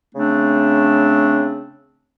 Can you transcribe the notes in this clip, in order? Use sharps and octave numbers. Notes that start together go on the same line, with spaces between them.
C#3 A3 C4 D4